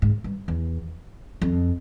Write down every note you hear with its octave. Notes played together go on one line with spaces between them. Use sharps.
G#2
G2
E2
F2